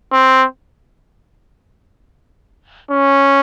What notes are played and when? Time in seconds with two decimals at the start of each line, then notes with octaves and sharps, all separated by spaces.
0.12 C4
2.91 C#4